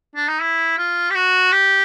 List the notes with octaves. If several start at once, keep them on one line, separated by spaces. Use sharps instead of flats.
D4
D#4
E4
F4
G4
F#4
G4